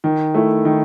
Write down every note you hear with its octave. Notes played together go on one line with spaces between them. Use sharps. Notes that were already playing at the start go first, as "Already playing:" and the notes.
D#3
A3 E4
D#3